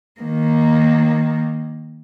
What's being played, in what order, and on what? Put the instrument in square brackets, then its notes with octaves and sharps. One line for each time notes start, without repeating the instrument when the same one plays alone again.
[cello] D#3 A#3